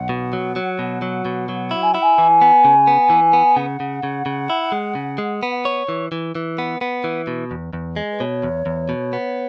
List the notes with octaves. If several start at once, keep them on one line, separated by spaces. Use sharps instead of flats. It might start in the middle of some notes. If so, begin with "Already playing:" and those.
Already playing: B1 F#5
B2
F#3
F#3
B2
F#3
B2
F#3
E4
G#5
E4 F#5
G#5
E3
B3
C#3
B3
E3
B3
C#3 F#5
C#3
C#3
C#3
E4
G#3
C#3
G#3
B3
C#5
E3
E3
E3
B3
B3
E3
B2
E2
E2
G#3
B4
B2 C#5
E2
E2
B2
B3